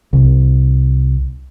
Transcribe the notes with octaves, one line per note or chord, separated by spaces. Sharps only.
C2